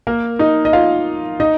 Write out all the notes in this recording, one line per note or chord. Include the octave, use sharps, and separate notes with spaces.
A#3 A#4
D#4 D#5
D#5
F4 F5
D#4 D#5